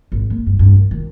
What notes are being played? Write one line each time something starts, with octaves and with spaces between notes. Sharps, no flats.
G#1
A#3
G2
G2
D#3
D#3